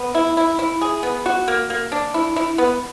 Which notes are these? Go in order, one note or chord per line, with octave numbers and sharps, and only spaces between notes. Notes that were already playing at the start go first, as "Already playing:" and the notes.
Already playing: B3
E4
E4
E4
G#4
B3
F#4
A#3
A#3
D4
E4
E4
B3